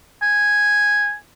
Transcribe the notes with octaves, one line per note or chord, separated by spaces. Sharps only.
G#5